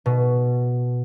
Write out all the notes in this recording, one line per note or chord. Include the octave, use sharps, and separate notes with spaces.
B2